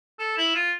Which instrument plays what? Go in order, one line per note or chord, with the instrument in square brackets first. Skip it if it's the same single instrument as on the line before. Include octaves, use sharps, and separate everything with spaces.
[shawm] A4
E4
F4